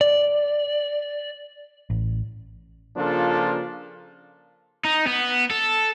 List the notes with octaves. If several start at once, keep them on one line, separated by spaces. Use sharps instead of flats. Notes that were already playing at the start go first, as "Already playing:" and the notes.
D5
A1
C#3 F3 A#3 D4 F4 A4
D#4
B3
A4